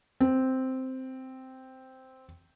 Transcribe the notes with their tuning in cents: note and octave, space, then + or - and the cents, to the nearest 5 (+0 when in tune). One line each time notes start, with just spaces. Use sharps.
C4 -5